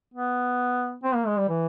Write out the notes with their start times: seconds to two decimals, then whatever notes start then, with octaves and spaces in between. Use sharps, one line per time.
0.14 B3
1.04 C4
1.15 A#3
1.27 G#3
1.38 G3
1.49 E3